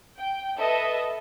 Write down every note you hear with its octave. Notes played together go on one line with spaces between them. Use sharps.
G5
A4 B4 D#5 E5